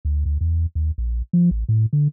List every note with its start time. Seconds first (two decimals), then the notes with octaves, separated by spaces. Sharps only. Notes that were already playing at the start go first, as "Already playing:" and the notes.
0.05 D2
0.26 D2
0.41 E2
0.75 D#2
0.98 A#1
1.33 F3
1.51 A1
1.69 A2
1.93 D3